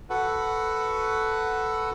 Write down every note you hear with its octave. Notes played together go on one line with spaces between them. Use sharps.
F#4 A4 B4 F#5